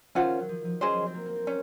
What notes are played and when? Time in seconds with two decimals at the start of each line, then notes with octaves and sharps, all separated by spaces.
0.15 D#3 C#4 F4 C5 F#5
0.40 F#3
0.49 F3
0.65 F3
0.81 F#3 C#4 G#4 C5 D#5
0.97 F#3
1.07 C4
1.14 A#3
1.26 A#3
1.36 C4
1.47 C#4